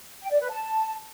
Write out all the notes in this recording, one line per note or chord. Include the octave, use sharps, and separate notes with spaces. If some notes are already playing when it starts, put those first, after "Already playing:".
G5
D5
B4
A5